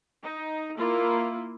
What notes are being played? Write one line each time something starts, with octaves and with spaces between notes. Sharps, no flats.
D#4
A#3 E4 F4